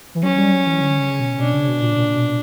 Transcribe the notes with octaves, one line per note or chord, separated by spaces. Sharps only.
E3
F#3 C#4
G3
F#3
E3
D3
C#3
B2
B2 D4
C#3
B2
A#2
A#2
B2